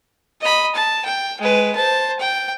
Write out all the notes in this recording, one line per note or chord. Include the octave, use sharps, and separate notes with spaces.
D#5 B5
A5
G5
G#3 B4
C5 A5
G5